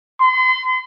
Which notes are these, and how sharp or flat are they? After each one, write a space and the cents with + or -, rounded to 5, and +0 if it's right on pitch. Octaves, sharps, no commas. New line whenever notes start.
C6 -40